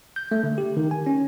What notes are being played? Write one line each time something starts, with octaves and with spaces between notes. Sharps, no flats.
G6
A3
D3
G4
D#3
G#5
C#4